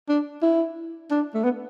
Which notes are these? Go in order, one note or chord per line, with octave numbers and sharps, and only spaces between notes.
D4
E4
D4
A3
B3